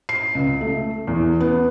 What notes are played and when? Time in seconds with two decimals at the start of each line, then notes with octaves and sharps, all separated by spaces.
0.09 C7
0.35 C#2
0.61 A3
1.07 E2
1.40 B3